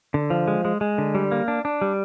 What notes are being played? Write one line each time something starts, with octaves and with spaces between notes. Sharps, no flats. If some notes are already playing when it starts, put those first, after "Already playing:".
D3
F3
G#3
G#3
G#3
D3
G3
A#3
D4
D4
G3